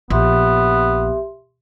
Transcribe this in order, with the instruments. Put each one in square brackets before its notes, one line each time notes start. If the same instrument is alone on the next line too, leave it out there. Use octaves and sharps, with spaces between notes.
[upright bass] A#1 [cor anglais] B3 [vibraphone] G4 E5 C6